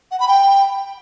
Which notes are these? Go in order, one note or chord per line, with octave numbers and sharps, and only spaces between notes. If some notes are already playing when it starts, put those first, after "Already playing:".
F#5
B5
G5